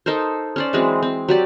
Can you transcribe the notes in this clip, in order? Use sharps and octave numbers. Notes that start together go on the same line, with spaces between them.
D#4 A4 A#4 C5
C#4 C5 D5
E3 F#3 G#3 C4
C4
F#3 G4 D5